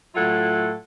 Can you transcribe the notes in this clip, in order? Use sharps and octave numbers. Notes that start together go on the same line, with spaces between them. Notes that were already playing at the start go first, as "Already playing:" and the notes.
A2 F#3 E4 F4 A4 F#5